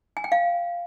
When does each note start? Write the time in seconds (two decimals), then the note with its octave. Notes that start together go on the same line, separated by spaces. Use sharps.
0.17 G#5
0.24 G5
0.32 F5